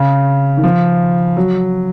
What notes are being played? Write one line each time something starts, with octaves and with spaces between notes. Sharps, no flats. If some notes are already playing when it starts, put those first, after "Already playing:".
Already playing: C#3
D#3
F3
F#3